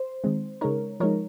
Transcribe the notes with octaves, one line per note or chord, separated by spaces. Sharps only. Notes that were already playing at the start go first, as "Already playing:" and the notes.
Already playing: C5
D#3 G#3 C4
C#3 G#3 D#4 A#4 C#5
F3 G#3 D#4 A#4 C#5